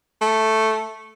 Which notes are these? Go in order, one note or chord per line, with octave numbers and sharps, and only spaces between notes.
A3